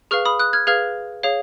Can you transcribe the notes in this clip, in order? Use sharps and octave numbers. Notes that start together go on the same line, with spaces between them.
G#4 B4 F5 C#6 F6
B5 D#6
D#6 F#6
F6 G#6
G#4 B4 F5 F6 G#6
G#4 C#5 F5